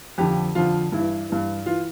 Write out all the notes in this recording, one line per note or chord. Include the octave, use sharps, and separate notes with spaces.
F2 D3 F3 G4
F2 D3 F3 F4
G2 E3 E4
G2 E3
E3 F4